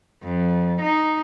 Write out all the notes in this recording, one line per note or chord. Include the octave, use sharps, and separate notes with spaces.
F2
D#4